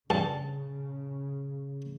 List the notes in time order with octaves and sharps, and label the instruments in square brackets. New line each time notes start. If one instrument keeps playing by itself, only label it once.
[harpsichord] G2 [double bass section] C#3 [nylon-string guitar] A5